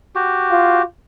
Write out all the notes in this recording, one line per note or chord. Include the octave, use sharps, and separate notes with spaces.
F#4 G4
F4